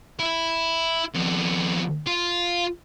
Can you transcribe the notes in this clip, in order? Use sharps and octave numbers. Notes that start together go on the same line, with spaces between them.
E4
F2 B3
F4